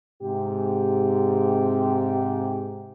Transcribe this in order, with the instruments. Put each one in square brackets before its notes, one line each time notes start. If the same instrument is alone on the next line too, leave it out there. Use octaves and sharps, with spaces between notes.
[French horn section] G#2 C3 G4